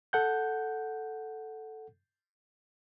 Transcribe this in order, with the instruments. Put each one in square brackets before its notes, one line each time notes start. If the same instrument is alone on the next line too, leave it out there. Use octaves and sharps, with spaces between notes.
[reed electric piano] A4 F#5 G6